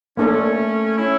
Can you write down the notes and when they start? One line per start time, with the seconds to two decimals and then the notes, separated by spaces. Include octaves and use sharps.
0.17 A3 A#3 C#4 D4 A4
0.98 C#4 E4